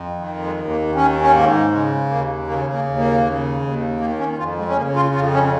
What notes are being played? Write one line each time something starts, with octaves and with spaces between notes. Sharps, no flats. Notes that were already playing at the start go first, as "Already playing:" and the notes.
Already playing: F2
D#3
G#3
D#2
A#3
D#3 C#4
C#4
G#2 A#3
C#3 G#3
D#2 A#3
C#3 A#3
A#3
D#2
A#3
C#3
D#2
D#3 A#3
C#4
F2 F4
G#3
C#4
C#3 A#3
F4
F2 F4
C#4